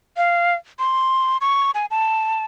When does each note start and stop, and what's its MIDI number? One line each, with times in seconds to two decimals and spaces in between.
0.17 0.55 77
0.79 1.37 84
1.41 1.71 85
1.75 1.86 80
1.91 2.45 81